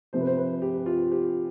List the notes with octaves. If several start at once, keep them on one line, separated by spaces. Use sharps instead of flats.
C3 F3 C5
B4
C5
B4
G4
F4
G4